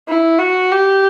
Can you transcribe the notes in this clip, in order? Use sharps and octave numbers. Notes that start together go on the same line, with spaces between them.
E4
F#4
G4